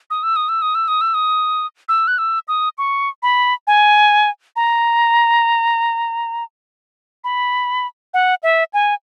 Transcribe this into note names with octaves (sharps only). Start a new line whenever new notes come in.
D#6
E6
D#6
E6
D#6
E6
D#6
E6
D#6
E6
F#6
E6
D#6
C#6
B5
G#5
A#5
B5
F#5
E5
G#5